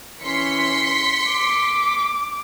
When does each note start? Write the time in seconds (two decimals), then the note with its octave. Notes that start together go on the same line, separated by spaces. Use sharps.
0.22 E3 C#4 C6 B6 C#7
1.30 D6